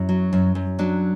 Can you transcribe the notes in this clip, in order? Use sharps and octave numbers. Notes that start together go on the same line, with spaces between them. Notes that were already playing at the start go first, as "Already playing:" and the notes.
Already playing: F#2 E4
F#3
F#2
F#2
F#3 D4